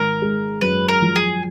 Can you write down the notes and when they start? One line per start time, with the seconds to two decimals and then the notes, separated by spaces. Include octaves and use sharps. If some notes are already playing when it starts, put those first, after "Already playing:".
Already playing: G#1 A#4
0.22 G#3
0.61 F#2 B4
0.88 A#4
1.02 F3
1.16 G#4